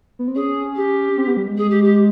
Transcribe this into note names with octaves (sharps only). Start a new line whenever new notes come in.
B3
C4
C#4 G#4
G4
C4
B3
G3
G#3
G#4
G4
G4